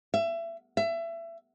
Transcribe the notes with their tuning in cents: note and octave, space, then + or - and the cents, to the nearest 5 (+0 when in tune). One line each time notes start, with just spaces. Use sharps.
E5 +25
E5 +25